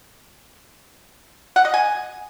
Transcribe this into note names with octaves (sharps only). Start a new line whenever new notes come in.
F#5
D#5
G#5